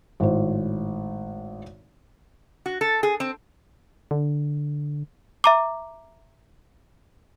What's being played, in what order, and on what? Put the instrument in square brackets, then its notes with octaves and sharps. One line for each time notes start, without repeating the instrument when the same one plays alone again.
[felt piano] G#1 A2 C5
[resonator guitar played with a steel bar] F#4
A4
G#4
C4
[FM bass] D3
[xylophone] E5 A#5 D6